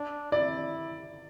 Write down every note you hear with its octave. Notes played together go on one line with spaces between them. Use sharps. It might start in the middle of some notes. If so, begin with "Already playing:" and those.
Already playing: D4
E4 D5